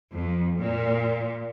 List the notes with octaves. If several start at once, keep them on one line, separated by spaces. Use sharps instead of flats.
F2
A#2